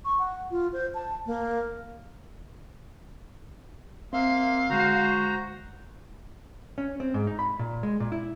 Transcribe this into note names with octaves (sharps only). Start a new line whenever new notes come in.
C#6
F#5
F4
C5
A5
A#3
A#3 C4 E5 F5 C6
D3 G#3 F#4 C5 A#5
C#4
C4
G#2
D#4
B5
A#2
G#3
A#2
E4